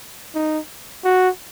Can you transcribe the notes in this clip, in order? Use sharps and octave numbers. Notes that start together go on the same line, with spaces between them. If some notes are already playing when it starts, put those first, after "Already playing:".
D#4
F#4